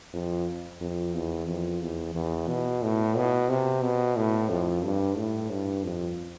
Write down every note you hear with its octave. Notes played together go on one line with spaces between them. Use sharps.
F2
F2
E2
F2
E2
E2
B2
A2
B2
C3
B2
A2
F2
G2
A2
G2
F2